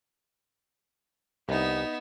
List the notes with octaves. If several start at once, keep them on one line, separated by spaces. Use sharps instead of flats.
C2 B3 D#4 E5